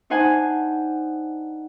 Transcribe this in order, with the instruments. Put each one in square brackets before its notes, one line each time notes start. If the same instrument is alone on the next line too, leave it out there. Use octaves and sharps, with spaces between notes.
[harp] D4 D#4 C5 F#5 G#5